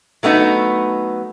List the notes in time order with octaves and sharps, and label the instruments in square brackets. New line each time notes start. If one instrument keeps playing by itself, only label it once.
[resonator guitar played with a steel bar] F#3 A3 B3 D#4